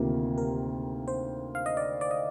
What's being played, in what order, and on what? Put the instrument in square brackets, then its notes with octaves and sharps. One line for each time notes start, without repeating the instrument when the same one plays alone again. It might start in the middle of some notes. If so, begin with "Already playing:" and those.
Already playing: [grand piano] D2 C3 D#3 A#3 F4 [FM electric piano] G4
[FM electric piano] A#4
C5
F5
D#5
D5
D5
D#5